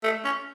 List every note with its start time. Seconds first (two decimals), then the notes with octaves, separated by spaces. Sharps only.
0.04 A3
0.24 C#4